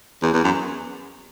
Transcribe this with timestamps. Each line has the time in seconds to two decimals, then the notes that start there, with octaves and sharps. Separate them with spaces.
0.23 E2
0.34 E2
0.44 F#2